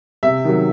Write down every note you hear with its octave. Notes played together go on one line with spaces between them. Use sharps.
C3 E5
D#3 F#3